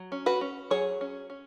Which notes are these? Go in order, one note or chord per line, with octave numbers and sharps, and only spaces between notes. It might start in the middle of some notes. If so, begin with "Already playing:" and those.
Already playing: F#3
C#4
F#4 B4
C#4
F#3 G#4 C#5
C#4
C#4